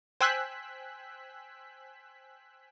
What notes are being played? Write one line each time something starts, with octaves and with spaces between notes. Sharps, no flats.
C5 G5 G#5 E6 F#6 B6